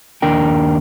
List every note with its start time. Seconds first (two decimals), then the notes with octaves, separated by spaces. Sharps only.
0.22 D#2 D4 A#4 G5